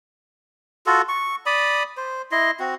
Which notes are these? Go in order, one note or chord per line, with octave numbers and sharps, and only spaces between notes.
F4 F#4 A4
C#6
D5 B5 D#6
C5
E4 D#5 C6
C4 F#4